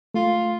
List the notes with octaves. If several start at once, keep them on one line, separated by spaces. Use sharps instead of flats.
A3 F4